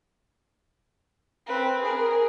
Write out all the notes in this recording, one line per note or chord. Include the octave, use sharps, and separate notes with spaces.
C4 B4
G#4 A#4